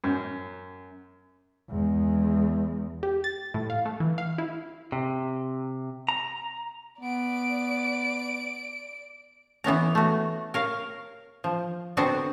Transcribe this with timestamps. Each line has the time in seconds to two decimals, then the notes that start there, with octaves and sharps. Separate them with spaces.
0.04 F#2
1.70 E2 G#3
3.03 G4
3.24 A6
3.54 A2
3.70 F5
3.85 A3
4.00 E3
4.18 F5
4.38 E4
4.92 C3
6.09 A#5
7.01 B3 D5 D7
9.64 E3 B3 C#4 A#5
9.95 A3 F#4
10.54 A#4 C#5 F5
11.44 F3
11.97 D3 B3 C4 F#4 C5 F#5